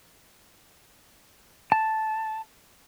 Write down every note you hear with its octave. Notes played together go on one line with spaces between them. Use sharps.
A5